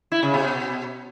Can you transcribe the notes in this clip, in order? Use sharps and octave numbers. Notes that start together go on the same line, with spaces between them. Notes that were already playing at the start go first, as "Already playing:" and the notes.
E4
C#3
B2